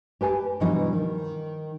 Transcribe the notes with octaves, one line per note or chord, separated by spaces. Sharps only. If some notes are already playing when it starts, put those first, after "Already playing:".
G4 B4 G#5 A5
G2 B2 E3 F3 D#4 F#4
D#3